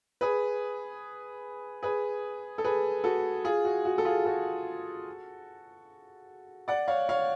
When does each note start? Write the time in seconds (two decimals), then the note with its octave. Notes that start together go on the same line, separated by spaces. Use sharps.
0.21 G#4 B4
1.83 G#4 B4
2.58 A4
2.64 G#4 B4
3.04 F#4 A4
3.44 F4 G#4
3.65 F#4
3.85 F#4
3.98 A4
4.05 F4 G#4
4.25 F#4 A4
6.68 D5 F#5
6.88 C#5 F5
7.09 C#5 F5